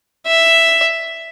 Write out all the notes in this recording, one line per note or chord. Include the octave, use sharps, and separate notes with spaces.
E5